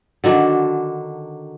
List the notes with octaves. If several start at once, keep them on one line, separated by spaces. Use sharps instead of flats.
D3 D#3 F#3 D4